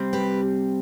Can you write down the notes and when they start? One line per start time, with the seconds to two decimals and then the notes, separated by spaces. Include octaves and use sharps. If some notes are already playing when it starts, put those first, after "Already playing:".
Already playing: C3 G3 C4
0.13 G4 B4